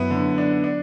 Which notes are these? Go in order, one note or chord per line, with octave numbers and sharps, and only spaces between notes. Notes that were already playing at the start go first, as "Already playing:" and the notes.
Already playing: F#2 B3 E4
D3
D4
D4